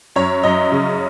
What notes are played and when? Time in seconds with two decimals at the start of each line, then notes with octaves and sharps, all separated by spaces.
0.16 F#2 C#5
0.43 F#2 D#5
0.72 C#3